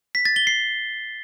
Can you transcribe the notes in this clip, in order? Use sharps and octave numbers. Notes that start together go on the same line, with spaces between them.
B6
A6
G7
C7